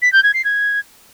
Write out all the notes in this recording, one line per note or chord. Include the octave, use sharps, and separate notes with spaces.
B6
G6
G#6
C7
G#6